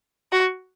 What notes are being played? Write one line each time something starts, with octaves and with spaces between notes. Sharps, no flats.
F#4